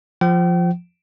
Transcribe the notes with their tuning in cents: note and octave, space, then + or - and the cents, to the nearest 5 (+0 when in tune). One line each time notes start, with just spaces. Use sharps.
F3 +0 G5 -40